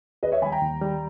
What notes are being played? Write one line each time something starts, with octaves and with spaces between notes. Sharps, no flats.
D#2 B4 D#5
C#5 E5
D#3 G3 G#5 B5
G5 A#5
D#2
D#3 G3